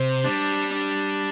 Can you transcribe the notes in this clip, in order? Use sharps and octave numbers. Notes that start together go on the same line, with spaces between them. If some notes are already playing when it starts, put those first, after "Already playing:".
Already playing: C3 C5
G3 D4
D4